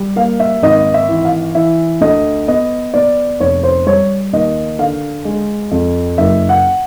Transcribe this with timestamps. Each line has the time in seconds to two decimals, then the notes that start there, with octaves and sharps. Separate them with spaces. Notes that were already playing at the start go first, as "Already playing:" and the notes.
Already playing: G3
0.16 A#3 F5
0.40 E5
0.63 G#1 D#5
0.94 E5
1.09 E3
1.25 F5
1.55 E3 E5
2.01 D2 D#5
2.48 B3 D#5
2.94 B3 D5
3.40 F1 C#5
3.63 C5
3.87 G3 C#5
4.33 D#2 D#5
4.79 D3 F5
5.25 G#3
5.71 F2
6.18 F#1 E5
6.49 F#5